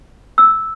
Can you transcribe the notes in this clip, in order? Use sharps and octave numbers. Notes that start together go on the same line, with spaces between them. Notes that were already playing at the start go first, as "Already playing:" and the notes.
E6